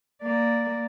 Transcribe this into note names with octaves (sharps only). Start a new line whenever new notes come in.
A#3 D5